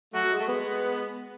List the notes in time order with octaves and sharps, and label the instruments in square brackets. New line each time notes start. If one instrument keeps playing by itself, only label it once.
[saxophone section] F#3 A3 [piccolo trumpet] F#4
[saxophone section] F#3
G#3
A3
G#3 B3